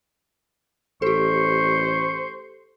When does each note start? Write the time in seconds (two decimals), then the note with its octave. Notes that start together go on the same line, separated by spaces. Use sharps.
1.02 A1 G4 A4 C5 C#6